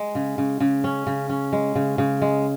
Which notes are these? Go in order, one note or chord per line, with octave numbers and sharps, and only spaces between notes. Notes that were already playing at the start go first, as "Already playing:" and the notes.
Already playing: G#3
C#3
C#3
C#3
C#4
C#3
C#4
G#3
C#3
C#3
G#3